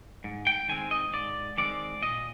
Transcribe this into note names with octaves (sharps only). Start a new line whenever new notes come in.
G#2
G5
D#3 G#3 C4 G#5
D#5
G#2 D5
D#3 G#3 C4 D5
A#2 D#5